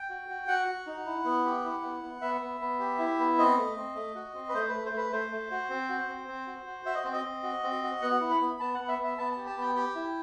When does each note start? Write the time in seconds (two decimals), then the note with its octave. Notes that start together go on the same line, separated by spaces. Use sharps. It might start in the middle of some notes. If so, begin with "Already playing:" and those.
Already playing: G5
0.10 F#4
0.29 F#4
0.47 F#4 F#5
0.68 F#4
0.87 D#4
1.06 E4
1.25 B3
1.45 G4
1.64 E4
1.83 B3
2.03 B3
2.21 B3 E5
2.41 B3
2.61 B3
2.79 G4
2.98 E4
3.19 B3
3.38 C4 D#5
3.57 A3
3.76 C4
3.95 A3
4.15 F#4
4.34 C4
4.49 B4
4.54 A3 C5
4.68 A3 B4
4.85 C5
4.92 A3 B4
5.12 A3 C5
5.31 A3
5.51 F#4
5.70 C4
5.89 F#4
6.08 C4
6.28 C4
6.47 F#4
6.66 F#4
6.86 F#4 E5
6.95 D#5
7.04 C4 C5
7.12 D#5
7.24 C4
7.43 F#4
7.63 C4
7.83 F#4
8.02 B3 F#5
8.21 E4
8.30 B5
8.41 B3
8.60 B3 A5
8.74 B3 F#5
8.88 E5
8.99 B3
9.04 E5
9.18 B3 A5
9.32 G4 A5
9.46 A5
9.56 B3 G5
9.75 G4 G5
9.95 E4